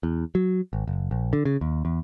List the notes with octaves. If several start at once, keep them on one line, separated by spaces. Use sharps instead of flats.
E2
F#3
G#1
F#1
A#1
D3
C#3
D#2
E2